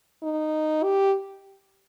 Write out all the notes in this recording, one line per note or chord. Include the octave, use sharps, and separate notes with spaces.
D#4
G4